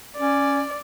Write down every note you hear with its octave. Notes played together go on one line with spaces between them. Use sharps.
C#4 D5